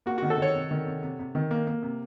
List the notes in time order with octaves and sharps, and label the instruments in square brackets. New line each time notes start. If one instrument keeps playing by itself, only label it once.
[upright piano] A#3 [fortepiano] F#4
[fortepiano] F#4
[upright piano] D#3
[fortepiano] A4
[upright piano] D#3 [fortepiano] C#5
[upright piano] C3
D#3
C3
C3
C3
D#3
A#3
A#3
C3